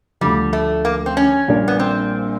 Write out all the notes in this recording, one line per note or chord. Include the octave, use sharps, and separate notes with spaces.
D2 D3 F3 G3
A3
A#3
C4
C#4
A#1 A#2 G3 A#3 D4
B3
C4